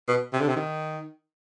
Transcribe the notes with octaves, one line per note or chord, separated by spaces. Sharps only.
B2
C3
D3
C3
D#3